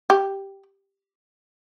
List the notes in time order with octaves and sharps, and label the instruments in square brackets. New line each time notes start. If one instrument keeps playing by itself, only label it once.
[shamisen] G4